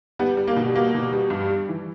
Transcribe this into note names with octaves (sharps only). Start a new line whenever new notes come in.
G3 B3
G3
A#3
B2
G3 A#3
B2
G3
G2
G3
E3